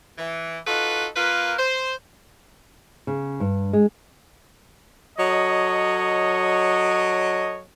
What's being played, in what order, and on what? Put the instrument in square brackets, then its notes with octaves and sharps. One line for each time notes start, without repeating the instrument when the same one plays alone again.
[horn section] E3
D#4 F4 F#4 A4 B4
A#3 F4 A#4 B4
C5
[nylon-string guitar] C#3
G2
G#3
[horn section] F#3 A4 C#5 D#5